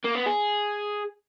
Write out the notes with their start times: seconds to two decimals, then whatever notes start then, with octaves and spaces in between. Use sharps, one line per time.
0.05 A#3
0.15 B3
0.26 G#4